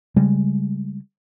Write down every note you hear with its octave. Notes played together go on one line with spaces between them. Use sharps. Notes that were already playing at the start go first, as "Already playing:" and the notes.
C#3 G3 G#3